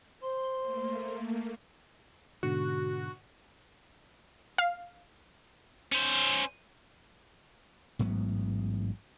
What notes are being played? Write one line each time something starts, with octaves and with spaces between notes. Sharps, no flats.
C5 C6
A3 A#3
G#2 B2 D3 F#4
F5
C#4 C5
A1 G#2 F#3 B3